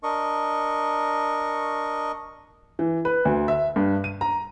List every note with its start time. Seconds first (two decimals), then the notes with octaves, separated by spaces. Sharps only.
0.03 D4 A#4 D#5 C#6
2.79 E3
3.05 B4
3.25 D2
3.48 E5
3.76 G2
4.04 D#7
4.21 A#5